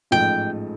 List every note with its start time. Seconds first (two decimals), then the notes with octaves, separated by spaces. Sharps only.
0.11 A1 G#2 F3 A3 G5